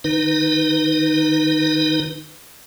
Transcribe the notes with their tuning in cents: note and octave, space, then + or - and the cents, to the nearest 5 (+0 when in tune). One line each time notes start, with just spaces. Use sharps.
D#3 -25 D#4 +0 B4 +0